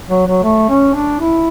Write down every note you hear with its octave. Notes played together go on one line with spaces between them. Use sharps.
F#3
F#3
A3
C#4
D4
E4